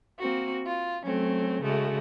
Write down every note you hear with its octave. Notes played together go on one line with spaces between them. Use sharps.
A#3 C4 F#4
F4
F#3 A3 C4 C#4
C#3 G#3 A3 F#4